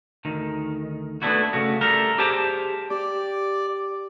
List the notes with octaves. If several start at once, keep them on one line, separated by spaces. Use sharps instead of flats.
D2 D#3
A3 B3 C4 D4 E4 F#4
C#3 A3 F#4
G3 A3 A4 A#4
G4 G#4 C5 G5 A5
G4 D5